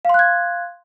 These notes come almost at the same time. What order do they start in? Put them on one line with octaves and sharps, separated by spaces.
F5 C6 F#6 G#6